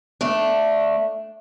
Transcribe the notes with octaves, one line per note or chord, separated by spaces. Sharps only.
A3 D4